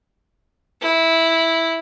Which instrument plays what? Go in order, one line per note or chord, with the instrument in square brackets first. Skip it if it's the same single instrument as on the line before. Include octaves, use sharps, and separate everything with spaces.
[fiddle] E4